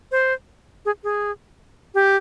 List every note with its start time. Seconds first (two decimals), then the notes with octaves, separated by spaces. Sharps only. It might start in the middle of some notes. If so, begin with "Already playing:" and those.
0.12 C5
0.85 G#4
1.04 G#4
1.94 G4